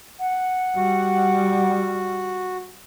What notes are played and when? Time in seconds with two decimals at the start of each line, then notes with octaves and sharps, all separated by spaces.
0.19 F#5
0.76 G3 F#4